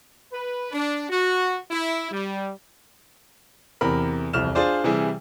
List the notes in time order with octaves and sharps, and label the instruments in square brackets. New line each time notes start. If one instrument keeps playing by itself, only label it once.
[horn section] B4
D4
F#4
E4
G3
[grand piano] E2 C3 A#4 B5
E1 C2 F2 F6 E7
D4 F4 G#4 C5 D5
C3 E3 G3 E4 G#4